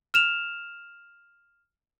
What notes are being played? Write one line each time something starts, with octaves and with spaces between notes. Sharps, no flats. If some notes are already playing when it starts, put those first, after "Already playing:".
F6 E7 F7